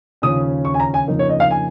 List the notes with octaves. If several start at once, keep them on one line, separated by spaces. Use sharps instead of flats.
D#2 C#3 F3 C#4 D#6
C#6
G#5
A#5
G#5
F2 C#3 A#3 D#4
C#5
D#5
F5
G#5